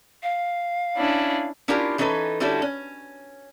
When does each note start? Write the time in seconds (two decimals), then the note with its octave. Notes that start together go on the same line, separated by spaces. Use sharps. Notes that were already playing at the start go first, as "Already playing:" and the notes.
0.23 F5
0.96 C#4 D4 E4
1.68 C#4 D4 E4 F4 G4 A#4
1.98 E3 C#4 D#4 A4 B4
2.40 D3 G3 C#4 E4 F#4 A4
2.62 C#4